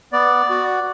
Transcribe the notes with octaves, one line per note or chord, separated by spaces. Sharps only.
B3 D5
F#4